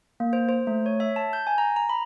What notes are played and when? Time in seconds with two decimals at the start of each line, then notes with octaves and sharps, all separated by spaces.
0.20 A#3
0.33 C5
0.49 C5
0.67 A3
0.86 C#5
1.00 E5
1.16 A5
1.33 G6
1.47 G#5
1.58 A#5
1.76 A#5
1.89 B5